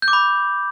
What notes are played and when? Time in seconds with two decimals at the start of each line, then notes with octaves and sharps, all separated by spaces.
0.02 G6
0.08 D6
0.13 B5